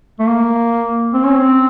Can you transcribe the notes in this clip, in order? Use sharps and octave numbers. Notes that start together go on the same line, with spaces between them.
A3
A#3
C4
C#4
C4